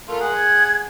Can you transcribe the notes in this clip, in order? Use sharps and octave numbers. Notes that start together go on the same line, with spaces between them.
A3 F4 A#4
G#4 F#5
G#6